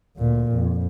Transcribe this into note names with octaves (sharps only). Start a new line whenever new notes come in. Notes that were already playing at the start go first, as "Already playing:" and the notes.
D2 A#2
F2